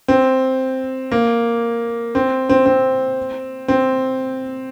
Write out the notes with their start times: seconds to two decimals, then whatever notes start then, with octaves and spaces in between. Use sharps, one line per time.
0.08 C4
1.12 A#3
2.15 C4
2.49 C4
2.66 C4
3.68 C4